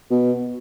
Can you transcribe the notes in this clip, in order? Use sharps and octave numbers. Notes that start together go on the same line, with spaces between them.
B2